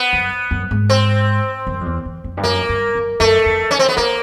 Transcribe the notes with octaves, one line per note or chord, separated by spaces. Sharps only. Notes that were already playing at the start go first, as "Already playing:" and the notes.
Already playing: B3
F#2
F#2
G#2
C4
F#2
F2
E2
E2
F2
G2
F#2 A#3
G2
F#2
F#2 A3
F2
C#4
C4
B3
A#2 A#3